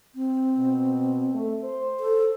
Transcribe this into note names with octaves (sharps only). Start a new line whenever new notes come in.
C4
B2
A3
C5
A4